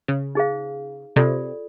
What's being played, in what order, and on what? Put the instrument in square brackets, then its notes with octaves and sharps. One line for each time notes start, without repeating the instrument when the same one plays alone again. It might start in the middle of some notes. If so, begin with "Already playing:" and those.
[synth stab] C#3
[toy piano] D#4 G#4 C5 F5
[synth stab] C3 [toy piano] F4 A4 D5